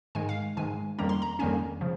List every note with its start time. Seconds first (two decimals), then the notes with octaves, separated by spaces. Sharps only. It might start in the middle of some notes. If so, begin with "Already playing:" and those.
0.15 G#2 D#3 G#3 G#5
0.29 F5
0.57 G#2 D#3 G#3 G#5
0.98 F2 D#3 G3 A#3 C#4 A#5
1.09 C6
1.22 A#5
1.39 F2 D#3 G3 A#3 C#4 G#5
1.81 C#3 F3